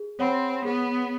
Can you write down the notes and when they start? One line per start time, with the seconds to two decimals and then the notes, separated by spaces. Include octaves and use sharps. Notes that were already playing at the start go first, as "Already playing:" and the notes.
Already playing: G#4
0.19 C4 C#5 F#5 B5
0.65 B3 G#4